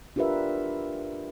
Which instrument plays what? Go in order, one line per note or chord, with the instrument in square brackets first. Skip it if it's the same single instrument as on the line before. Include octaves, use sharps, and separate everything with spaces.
[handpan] D4 F4 G4 A#4 B4 E5